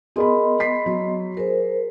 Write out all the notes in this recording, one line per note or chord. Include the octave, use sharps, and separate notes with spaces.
B3 G#4 A#4 D#5 B5 C6
B5 B6 C7
F#3
G#4 A#4 C5